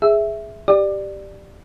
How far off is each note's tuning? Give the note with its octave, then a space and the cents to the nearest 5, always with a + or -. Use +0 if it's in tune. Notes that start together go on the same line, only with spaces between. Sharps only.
G#4 +0 E5 -5
G4 +0 D5 +15